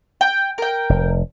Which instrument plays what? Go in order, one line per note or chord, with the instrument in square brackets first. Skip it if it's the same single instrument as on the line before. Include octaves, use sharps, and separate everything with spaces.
[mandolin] G5
A#4 G5
[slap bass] F1